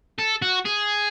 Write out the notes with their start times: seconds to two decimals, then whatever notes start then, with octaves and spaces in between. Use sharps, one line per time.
0.19 A4
0.42 F#4
0.65 G#4